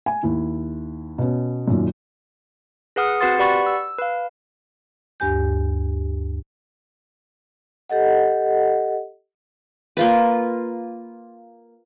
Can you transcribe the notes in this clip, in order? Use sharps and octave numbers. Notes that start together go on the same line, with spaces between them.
G#5
D#2 E4
B2 C#4
F#2 A#2 D#3
G#4 B4 F#5 D#6 F6
C4 F#4 B4 F#5 C6 A6
G4 B4 D5 F#5 B5 C#6
E6
B4 F5
D2 G2 G4 G#5 G6
G4 A4 D#5 F#5
A#3 F4 B4